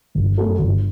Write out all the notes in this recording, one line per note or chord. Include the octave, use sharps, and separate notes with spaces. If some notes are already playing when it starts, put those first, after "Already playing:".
G1
F#2 F#3 A3
G1